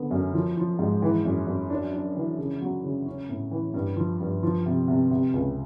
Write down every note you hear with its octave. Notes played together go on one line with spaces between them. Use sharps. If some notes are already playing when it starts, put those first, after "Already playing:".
Already playing: D3 B3
F#2
F3
F3
G#2
E3
F#2
F#2
D4
D4
E3
C#3
F#3
C#3
C#4
A2
E3
G2
F3
G2
F3
C3
C3
C3
C#2